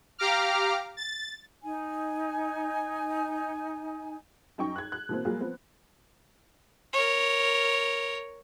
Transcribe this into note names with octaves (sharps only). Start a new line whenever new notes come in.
G4 F5 A#5 D6 F6
A6
D#4 G#5
F#2 D#4 G5 C#6
F#6 G#6
F#6
B2 E3 A#3 C4
F#3 G3 A#3 F4 G#4
F3 B3 C4
A#4 C#5